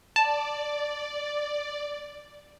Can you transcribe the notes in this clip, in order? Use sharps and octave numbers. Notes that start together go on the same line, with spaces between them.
D5 A5